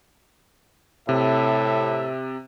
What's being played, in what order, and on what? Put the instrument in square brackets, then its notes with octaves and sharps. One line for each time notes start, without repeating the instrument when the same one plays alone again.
[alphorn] A2 [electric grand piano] C3 [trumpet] E5